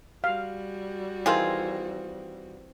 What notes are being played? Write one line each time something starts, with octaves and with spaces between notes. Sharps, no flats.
G3 F#4 F5
D#3 E3 C4 F4 G#4